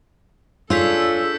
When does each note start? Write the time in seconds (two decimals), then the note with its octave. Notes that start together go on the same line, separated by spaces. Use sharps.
0.70 D4 F4 G#4 A4 C#5 E6 G6 B6